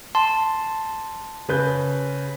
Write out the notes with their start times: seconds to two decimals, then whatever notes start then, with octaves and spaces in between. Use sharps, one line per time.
0.15 A5 C6
1.49 C#3 B4 G6